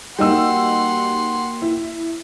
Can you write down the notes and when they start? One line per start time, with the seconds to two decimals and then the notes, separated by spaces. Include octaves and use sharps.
0.19 G3 A#3 D#4 F#4 F#5 G5 C6 E6
1.62 E4